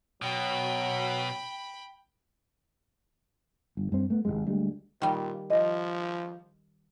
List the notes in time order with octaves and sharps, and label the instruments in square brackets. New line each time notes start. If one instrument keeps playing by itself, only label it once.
[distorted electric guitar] B2 [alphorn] F#3 [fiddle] G5 B5
[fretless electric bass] G1
G2 C4
A3 B3
G#1 C#2 C3 G#3
D2 G3 G#3
[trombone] A#2 [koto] D#3 G3
[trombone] F3 [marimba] D#5